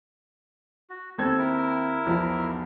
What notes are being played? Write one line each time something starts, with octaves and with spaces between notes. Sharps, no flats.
F#4
D#2 C4 A4 G#6
E4 A#4
B1 E2 F3